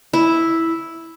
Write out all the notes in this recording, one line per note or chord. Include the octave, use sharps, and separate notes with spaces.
E4